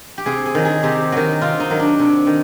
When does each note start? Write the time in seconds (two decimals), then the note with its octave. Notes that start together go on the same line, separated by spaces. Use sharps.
0.18 G4
0.26 C3 G#4
0.46 G#4
0.55 D#3 F#3
0.65 G#4
0.83 C3 G4
1.12 D#3 F#3 F#4
1.41 C3 F4
1.60 D#4
1.70 D#3 F#3
1.80 D4
1.99 C3
2.27 D#3